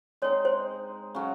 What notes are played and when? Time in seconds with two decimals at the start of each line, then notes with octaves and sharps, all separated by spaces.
0.22 G#3 C4 D#4 C#5
0.45 C5
1.15 C#3 F#3 C#4